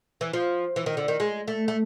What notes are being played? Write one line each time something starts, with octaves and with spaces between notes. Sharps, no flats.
E3
F3
E3
D#3
D3
D#3
G#3
A3
A3